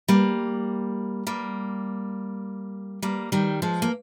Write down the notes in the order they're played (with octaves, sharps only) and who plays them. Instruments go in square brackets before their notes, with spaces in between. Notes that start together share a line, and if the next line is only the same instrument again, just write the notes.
[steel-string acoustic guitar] G3 A#3
G3 A#3
G3 A#3
D#3 G3
F3 G#3
A#3